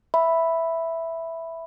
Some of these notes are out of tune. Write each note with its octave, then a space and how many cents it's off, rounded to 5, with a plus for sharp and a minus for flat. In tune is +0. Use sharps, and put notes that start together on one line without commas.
E5 +0 B5 +0